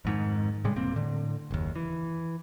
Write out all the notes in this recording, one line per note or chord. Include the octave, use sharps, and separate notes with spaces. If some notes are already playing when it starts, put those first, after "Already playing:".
F2 G#2 D#3
A2 C#3 G3 G#3
E1 A#3 C4
A2 D3
F#1 D#2
E3